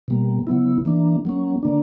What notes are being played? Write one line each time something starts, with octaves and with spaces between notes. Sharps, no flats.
B2 G3 A#3
C#3 F#3 B3 E4
E3 A#3 D4
F#3 A#3 C#4
D3 A#3 D4